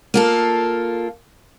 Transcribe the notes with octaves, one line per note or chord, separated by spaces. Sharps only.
A#3 F4 A4